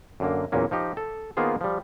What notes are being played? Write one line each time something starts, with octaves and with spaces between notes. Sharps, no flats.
F#2 D3 A#3
E2 A#2 F#3 A#3 C#4
F3 D#4 G4
A4
D#3 A#3 B3 F4 G#4 C5
F3 G3